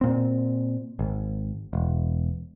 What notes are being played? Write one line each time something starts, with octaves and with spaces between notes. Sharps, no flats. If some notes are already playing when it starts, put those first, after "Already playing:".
A#2 C4
G#1
E1